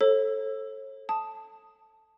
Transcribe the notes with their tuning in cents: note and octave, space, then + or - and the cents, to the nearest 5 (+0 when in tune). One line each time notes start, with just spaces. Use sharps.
A4 +0 C#5 -45
A5 +0 D#6 +0